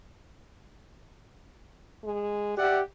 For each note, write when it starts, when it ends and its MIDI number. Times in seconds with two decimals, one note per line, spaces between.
2.04 2.57 56
2.57 2.82 67
2.57 2.79 74
2.57 2.79 76
2.57 2.79 78